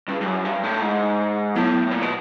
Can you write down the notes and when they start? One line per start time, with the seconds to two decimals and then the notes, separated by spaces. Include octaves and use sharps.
0.08 G2 C#4 E4 G#4
0.21 G2
0.26 F#2
0.45 G2
0.64 A2
0.81 G#2
1.55 A2 F#3 B3 E4
1.92 A#2
2.02 B2